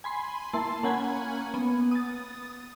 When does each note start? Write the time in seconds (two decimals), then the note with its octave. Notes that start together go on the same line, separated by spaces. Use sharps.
0.04 G#5 B5 C6
0.53 A#3 E4 A5 C6
0.83 A#3 C#4 F#5 G#5 B5 G#6
1.54 B3
1.91 D#6 A6